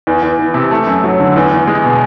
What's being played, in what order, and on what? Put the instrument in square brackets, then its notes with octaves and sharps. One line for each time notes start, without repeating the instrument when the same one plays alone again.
[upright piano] E2
E2
E3
C3
A3
F#2
F#3
D3
E2
E2
G#3
B2